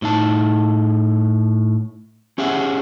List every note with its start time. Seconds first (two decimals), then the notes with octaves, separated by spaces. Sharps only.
0.02 A2 D#4 A5
2.38 C#4 G4 G#4 E5 F#5